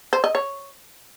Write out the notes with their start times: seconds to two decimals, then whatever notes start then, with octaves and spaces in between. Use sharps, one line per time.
0.13 C5
0.24 D#5
0.35 C#5